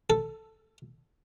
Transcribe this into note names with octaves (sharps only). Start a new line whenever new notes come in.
A4